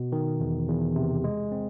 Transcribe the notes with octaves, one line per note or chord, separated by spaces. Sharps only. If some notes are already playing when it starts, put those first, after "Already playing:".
Already playing: B2
D#3
E2
E2
C3
G#3
C4